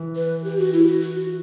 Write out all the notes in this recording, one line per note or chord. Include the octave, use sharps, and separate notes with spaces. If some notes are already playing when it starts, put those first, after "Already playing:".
Already playing: E3
B4
G4
F#4
E4
F#4
F#4